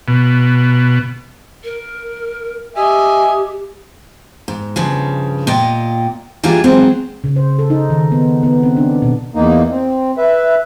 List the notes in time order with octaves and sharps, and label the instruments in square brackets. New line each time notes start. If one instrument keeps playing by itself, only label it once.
[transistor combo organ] B2
[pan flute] A#4
[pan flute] G4 [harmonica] D#5 E5 G#5
[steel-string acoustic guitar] G#2
G2 C#3 F3
A#2 F4 D#5 G5
E3 G3 A#3 D4 F4 G#4
F#3 G#3 C4 F4 F#4
[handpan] C#3
C5
A4
D#4
D#3
B3
B3
C4
D4
B2
[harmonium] E2 A#3 D#4
C4
B4 E5